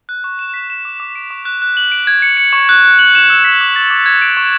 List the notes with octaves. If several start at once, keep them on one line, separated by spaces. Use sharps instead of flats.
F#6
C#6
E7
B6
E7
D6
D6
D7
C#6
F#6
F#6
F#7
D7
G#6
C#7
C#7
C#6
F#6
F#6
F#7
E7
E6
B6
D6
A6
D6
G#6
D7
C#6